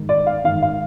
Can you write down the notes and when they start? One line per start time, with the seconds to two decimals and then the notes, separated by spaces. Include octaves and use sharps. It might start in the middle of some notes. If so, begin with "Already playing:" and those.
Already playing: G#2 D#3
0.09 D5
0.26 F5
0.44 G#2 D#3 F5
0.62 F5